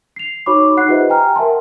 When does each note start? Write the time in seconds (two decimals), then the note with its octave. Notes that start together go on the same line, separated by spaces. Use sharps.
0.16 C7 F7
0.46 D#4 F#4 C#5 B5 C#6 D6
0.77 D#4 F#5 F#6 C7
0.88 F4 G4 B4 C5 D#5 E5
1.10 G5 G#5 A#5 F6
1.36 A#4 E5 F#5 A5 C6